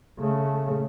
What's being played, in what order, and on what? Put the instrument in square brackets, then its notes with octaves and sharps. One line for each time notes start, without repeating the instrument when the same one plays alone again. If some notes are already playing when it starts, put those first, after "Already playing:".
[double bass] C#3 A3